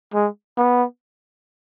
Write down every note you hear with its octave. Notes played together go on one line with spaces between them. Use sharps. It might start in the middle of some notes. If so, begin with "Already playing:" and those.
G#3
B3